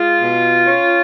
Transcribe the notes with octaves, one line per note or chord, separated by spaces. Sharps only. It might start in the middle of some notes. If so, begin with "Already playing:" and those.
Already playing: G#3 F4
B2
C#4